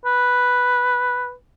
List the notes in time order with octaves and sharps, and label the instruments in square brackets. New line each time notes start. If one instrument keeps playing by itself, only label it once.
[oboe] B4